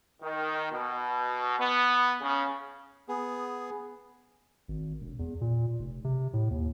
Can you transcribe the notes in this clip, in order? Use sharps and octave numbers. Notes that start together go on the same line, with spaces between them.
D#3
B2
B3
C#3
B3 G#4
G#1
E1
E2
A#2
F1
C3
A2
D#2